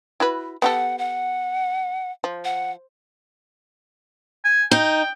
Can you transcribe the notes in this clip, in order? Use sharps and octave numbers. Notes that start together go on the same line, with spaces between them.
E4 F#4 B4
B3 G4 A4 F#5
F#5
F3
F#5
G#5
D#4 G5